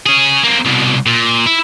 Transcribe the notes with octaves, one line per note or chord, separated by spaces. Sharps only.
C#4 G#4
A#3 C4
C2 B2
A#2
E4